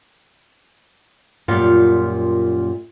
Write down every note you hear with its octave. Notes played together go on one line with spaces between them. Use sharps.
F#2 A#2 G3 F4